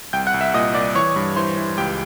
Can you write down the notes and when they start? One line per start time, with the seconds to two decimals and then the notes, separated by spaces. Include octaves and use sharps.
0.13 C2 G5 G6
0.27 F#5 F#6
0.34 C2
0.41 E5 E6
0.54 A#2 D#5 D#6
0.75 C2 D5 D6
0.95 E3 C#5 C#6
1.16 G2
1.36 E3 C5 C6
1.57 E3
1.78 C#2 G4 G5